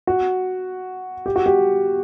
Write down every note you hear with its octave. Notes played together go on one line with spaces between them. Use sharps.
F#4
G4
F#4
G4